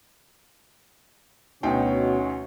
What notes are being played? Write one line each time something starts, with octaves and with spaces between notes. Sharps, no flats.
D2 B2 C#4 D#4 F#4 C#5 G5